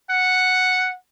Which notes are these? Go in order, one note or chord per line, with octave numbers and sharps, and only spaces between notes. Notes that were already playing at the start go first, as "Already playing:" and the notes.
F#5